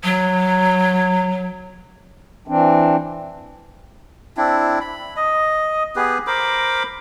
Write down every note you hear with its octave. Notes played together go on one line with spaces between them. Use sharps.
F#3
E3 C4 D4
C4 D4 E4
B5
D#5
B3 G4 G#4 B4
A#4 C5 B5 D6